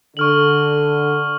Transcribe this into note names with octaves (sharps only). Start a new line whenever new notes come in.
D3 C#6 F6 F#7